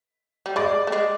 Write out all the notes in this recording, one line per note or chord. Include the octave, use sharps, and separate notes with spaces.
G3
G#3 D5
A3
G#3